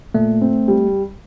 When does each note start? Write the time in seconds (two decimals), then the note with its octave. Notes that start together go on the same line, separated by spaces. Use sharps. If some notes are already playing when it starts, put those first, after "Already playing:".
0.14 A#2 A3
0.41 C4
0.68 G3